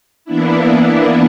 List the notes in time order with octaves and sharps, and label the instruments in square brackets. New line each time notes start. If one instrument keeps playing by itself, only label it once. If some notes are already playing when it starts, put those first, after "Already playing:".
[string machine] E3 A#3 B3 D4 E4